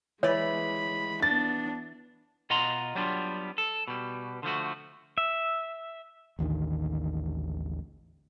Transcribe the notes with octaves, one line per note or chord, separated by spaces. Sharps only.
E3 G#3 C#5 D5 B5
B3 D4 A6
B2 F4 D#5 F#5 A#5 C6
F#3 G3 B3 D4 F4
A4
B2 G3
D3 F3 A3 F#4
E5
A1 D#2 D3 D#3